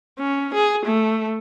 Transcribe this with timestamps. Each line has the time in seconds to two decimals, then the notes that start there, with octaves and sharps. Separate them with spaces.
0.19 C#4
0.54 G#4
0.86 A3